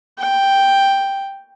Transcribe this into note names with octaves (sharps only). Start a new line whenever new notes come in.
G5